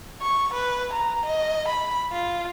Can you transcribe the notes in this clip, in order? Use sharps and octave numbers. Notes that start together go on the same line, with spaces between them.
C#6
B4
A#5
D#5
B5
F4